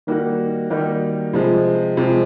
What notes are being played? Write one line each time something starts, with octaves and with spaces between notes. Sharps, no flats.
D#3 G3 A#3 D#4 F#4
D#3 G3 A#3 D#4 F#4
C3 F3 G#3
C3 F3 G#3